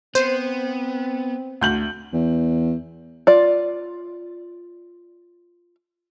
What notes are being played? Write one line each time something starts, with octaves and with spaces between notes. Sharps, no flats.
B3 C4 C5
D2 G6 F#7
E2
F4 D5